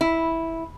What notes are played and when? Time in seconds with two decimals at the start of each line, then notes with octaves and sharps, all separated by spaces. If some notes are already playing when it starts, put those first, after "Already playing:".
0.01 E4